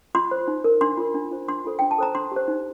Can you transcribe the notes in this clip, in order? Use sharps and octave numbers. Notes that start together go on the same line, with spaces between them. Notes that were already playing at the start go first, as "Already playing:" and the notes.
F4 C6
C5
D#4
A#4
D4 C6
F4 A#4
D4
F4 C5
D4 C6
F4 A4 C5
D4 G5
A5
A4 C5 A#5
D4 C6
G4 C5
D#4